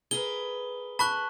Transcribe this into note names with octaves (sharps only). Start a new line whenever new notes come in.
G#4 A#4 B4 G7
A5 B5 C#6 F#6